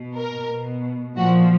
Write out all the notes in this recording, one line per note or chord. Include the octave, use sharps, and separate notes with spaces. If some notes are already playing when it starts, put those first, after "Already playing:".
Already playing: B2
A#4
B2
A#2 F3 F#4